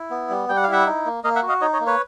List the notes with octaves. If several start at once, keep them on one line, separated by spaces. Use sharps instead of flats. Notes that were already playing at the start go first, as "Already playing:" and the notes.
Already playing: E4
B3
G3
G3 G5
F#5
F5
E4 E5 F#5
D#4
A#3
A#3 D#5 F5
E5 F#5
F#4
D#5 F5
D#4 C#5 D#5
C#5 D#5
A#3
B4 C#5